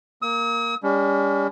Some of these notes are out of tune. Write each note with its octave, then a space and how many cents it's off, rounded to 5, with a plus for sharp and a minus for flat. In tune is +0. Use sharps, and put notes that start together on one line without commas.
A#3 +0 D#6 +45
G3 +40 C#4 +45